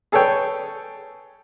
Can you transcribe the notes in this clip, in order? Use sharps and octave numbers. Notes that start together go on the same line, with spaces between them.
G#4 A4 B4 C#5 G5